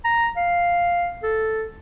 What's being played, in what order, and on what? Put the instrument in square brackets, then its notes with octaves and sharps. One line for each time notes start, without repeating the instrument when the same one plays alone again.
[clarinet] A#5
F5
A4